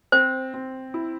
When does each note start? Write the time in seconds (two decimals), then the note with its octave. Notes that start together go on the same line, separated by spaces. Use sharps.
0.12 C4 C5
0.54 C4
0.94 E4